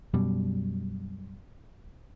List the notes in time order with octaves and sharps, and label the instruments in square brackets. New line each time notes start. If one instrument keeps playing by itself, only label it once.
[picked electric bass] F#2 B2 G3